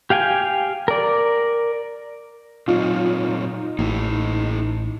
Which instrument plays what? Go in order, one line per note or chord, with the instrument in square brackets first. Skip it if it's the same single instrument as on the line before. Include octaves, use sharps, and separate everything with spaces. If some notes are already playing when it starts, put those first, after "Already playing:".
[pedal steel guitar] G4 F5 G5 G#5
A#4 D5
[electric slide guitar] A#2 F#3 C4 [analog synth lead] D#4 [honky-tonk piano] F4
[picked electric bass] A1 [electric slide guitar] A#3 E4